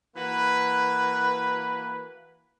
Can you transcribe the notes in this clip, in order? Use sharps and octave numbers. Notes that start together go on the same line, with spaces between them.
E3 A#3 F#4 B4